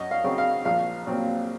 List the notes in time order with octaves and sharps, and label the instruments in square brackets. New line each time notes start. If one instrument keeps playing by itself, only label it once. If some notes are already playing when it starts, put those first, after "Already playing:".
Already playing: [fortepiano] F#2 D#5
F5
C#3 F#3 C4
F5
A#1 F5
A#2 F#3 C4